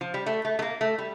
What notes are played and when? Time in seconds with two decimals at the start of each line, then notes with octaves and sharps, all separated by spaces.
0.01 F3
0.14 G3
0.26 A3
0.45 A3
0.59 A3
0.62 A#3
0.81 A3
0.98 G3